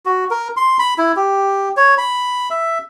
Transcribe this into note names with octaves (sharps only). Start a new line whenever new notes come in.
F#4
A#4
C6
B5
E4
G4
C#5
B5
E5